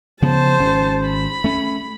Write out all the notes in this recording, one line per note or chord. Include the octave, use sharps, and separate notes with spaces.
C#3 F3 B3 C5 A5
G#1 C#4
B5
A3 C#4